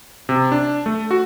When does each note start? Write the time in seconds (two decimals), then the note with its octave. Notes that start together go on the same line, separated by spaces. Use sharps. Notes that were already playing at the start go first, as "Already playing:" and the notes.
0.29 C3
0.52 D4
0.86 A3
1.11 F#4